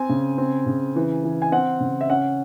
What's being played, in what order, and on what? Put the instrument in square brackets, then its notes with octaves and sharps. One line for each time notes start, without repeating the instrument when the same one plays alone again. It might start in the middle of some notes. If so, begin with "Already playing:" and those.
Already playing: [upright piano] C4 G#5
C#3
C4
C#3
E3
E3
G#5
C4 F#5
C#3
E5
C#4 F#5